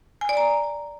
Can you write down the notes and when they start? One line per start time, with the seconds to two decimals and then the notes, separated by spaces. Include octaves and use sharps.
0.21 G#5
0.29 D5
0.37 A#5